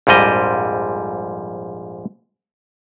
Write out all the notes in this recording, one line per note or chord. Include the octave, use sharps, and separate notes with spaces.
A#1 F2 G#2 G3 D#5